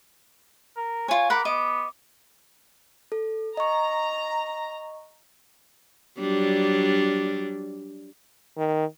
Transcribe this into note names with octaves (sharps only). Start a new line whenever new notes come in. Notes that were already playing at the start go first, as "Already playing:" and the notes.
A#4
F4 C#5 G#5
A#4 F#5 B5 D6
B3 D#5 D6
A4
D#5 A#5 C#6
F#3 G3 D4
D#3